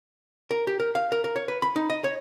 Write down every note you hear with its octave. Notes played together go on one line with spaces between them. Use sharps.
A#4
G4
A#4
F5
A#4
A#4
C#5
B4
B5
D#4
D#5
C#5